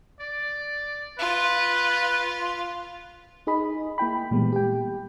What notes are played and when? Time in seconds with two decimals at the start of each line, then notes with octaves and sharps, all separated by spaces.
0.21 D5
1.19 F4 B4
3.47 D#4 G#4 D#5 B5
3.98 A#3 E4 G5 B5
4.31 A#2 E3 G3 G#3 B3
4.52 G4 G5